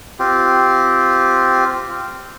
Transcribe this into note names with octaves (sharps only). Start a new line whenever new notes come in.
C4 F4 G4